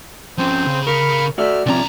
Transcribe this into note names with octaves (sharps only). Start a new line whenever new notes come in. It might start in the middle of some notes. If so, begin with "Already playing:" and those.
F3 C4 C#4 C5
C#3
A#4 B5 C#6 F6
A3 F#4 D5 E5 F6
C2 C3 F3 C#4 D5 A#5